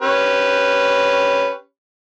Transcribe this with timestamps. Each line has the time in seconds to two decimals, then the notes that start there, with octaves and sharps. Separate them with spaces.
0.02 C#4 G4 B4